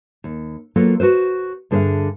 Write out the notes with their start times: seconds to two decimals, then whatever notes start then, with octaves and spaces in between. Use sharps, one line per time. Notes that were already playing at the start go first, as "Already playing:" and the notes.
0.24 D#2
0.76 F#3 A#3 B3 F4 A4
1.00 F#4 A4 B4 C5
1.71 G2 D3 G#4 C5 E5 F5